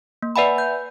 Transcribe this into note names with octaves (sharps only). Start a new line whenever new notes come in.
A#3
B4 D5 E5 F#5 G#5 B5
G6